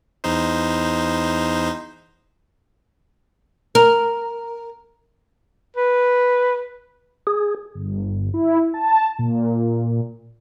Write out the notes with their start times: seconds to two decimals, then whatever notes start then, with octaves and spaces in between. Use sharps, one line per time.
0.24 E2 D#4 C5
3.75 A#4
5.77 B4
7.27 G#4
7.75 G1
8.34 E4
8.74 A5
9.19 A#2